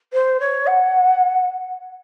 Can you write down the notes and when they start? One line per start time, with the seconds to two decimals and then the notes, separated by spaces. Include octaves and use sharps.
0.13 C5
0.40 C#5
0.67 F#5